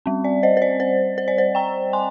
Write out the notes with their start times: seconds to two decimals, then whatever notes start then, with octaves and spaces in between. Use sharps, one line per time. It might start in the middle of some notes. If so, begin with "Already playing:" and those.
0.06 G3 C4
0.24 D5
0.43 C5 D#5
0.57 C5
0.62 D5
0.80 C5
1.18 C5
1.28 D5
1.38 C5
1.55 G5 A#5
1.93 G#5 C6